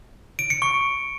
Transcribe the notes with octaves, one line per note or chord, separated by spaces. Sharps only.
D7
C#7
C#6